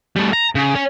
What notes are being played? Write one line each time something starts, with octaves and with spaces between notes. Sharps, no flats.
G3 A3
A#5
C#3
C#4